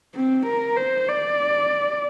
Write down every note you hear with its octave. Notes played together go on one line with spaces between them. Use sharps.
C4
A#4
C5
D5